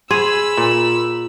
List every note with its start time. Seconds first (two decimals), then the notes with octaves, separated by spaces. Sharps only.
0.11 G#4 B5 C6 E6
0.58 A#2